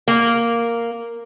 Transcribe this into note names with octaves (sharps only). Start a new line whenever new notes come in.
A#3